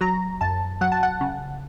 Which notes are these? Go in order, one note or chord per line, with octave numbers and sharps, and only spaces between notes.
F#3 A#5
F#2 A5
F#3 F#5
A5
F#5
C#3